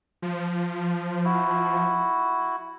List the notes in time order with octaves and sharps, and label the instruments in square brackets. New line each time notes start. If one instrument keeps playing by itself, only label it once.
[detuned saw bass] F3
[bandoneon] E4 F#4